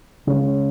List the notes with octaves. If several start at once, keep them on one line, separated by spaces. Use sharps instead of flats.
C#3 G#3 C#4